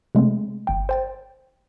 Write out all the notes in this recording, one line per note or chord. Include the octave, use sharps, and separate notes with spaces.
C3 G#3 A3 C4
G1 G5
C5 G5 A6